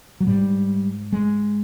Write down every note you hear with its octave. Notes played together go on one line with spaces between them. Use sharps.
F#3
G#2 G3
G#3